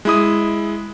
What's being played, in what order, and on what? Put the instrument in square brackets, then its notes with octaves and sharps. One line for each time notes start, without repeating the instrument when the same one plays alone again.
[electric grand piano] G#3 E4 D#6